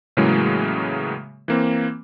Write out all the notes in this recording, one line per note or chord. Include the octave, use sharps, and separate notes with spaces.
A2 C#3 E3 F#3 G#3 A#3
E3 A#3 C4